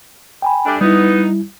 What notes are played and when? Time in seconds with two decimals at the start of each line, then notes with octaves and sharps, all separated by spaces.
0.42 G5 G#5 B5
0.66 G3 A3 D4
0.81 G3 B3 D#4 E4